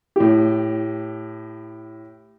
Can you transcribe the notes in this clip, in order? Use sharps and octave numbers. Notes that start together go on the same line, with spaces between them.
A2 G4